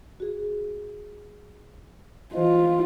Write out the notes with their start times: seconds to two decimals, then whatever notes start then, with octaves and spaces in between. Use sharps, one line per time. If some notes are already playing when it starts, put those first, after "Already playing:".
0.20 F#4 G#4
2.33 E3 F4 C5 D#5